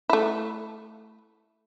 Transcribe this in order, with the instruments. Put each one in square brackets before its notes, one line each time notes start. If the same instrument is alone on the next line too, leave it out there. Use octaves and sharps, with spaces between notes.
[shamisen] A3 E4